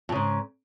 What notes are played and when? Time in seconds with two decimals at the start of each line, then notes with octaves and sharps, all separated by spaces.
0.09 F2
0.12 C#3
0.16 G#2